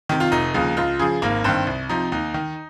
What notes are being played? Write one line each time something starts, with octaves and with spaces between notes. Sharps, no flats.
C3 D#3
F4
F1 D#4
D#2 C#3 F3
C#2 F4
C#3 F3 G#4
G#1 A#3
G2 D#3 C4
C2
C3 F3 D#4
D#2 D#4
D#3